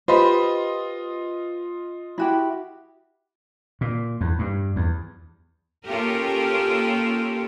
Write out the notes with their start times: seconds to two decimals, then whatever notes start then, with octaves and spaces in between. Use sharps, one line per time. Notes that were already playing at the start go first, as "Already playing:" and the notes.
0.08 F4 G4 B4 C5 D#5
2.18 E4 F#4 G4
3.81 A#2
4.21 E2
4.39 G2
4.76 E2
5.86 A#3 C#4 F4 G4 A4 A#4